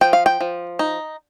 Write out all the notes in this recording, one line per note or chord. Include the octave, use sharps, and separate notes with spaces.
F3 G5
F5
G5
F3
D#4